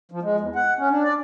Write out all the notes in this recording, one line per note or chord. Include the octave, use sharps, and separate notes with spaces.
F3
G#3
E2
F#5
C#4
D4
D5